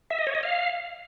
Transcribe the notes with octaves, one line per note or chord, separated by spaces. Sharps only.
E5
D#5
C#5
D#5
F5